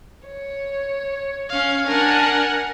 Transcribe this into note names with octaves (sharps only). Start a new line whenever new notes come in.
C#5
C#4 F5
D4 A#4 F#5 G#5